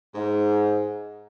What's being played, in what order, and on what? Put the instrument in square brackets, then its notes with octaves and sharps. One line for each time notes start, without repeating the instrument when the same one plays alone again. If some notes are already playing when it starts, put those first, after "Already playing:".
[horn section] G#2